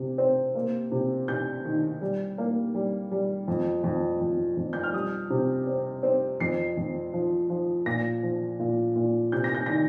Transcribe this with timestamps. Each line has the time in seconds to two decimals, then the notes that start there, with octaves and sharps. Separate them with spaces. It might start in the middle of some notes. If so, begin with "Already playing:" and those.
Already playing: C3
0.18 C4
0.55 A#3
0.92 C3
1.28 C3 G6
1.65 D#3
2.01 G3
2.38 A#3
2.74 G3
3.12 G3
3.48 F2
3.84 F2
4.20 F2
4.57 F2
4.73 G6
4.83 F6
4.93 G3 D#6
5.30 C3
5.67 C4
6.03 C4
6.40 F2 C7
6.77 F2
7.13 F3
7.50 F3
7.86 A#2 A#6
8.23 F3
8.59 A#2
8.96 A#2
9.32 C3 G6
9.44 A#6
9.55 G6
9.66 D#3 A#6